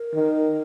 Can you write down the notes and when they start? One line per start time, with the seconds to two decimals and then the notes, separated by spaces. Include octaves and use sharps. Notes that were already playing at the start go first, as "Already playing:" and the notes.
Already playing: A#4
0.14 D#3